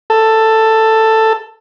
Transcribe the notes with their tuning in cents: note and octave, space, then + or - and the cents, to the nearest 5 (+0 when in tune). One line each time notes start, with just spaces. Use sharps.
A4 +10